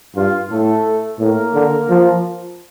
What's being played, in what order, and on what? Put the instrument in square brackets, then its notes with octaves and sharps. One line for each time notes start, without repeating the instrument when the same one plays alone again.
[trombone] G2 [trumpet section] F4
[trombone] A2 [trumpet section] A3 A4
[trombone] A2 [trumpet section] A#3 A#4
[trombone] D3
F3